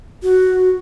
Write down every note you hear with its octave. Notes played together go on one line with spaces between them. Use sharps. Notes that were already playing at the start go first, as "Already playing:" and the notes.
F#4